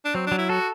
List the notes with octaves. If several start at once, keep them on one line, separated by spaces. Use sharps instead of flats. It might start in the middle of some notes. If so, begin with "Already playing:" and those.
D4
F#3 C4
F#3 D4
E4
F#4 A4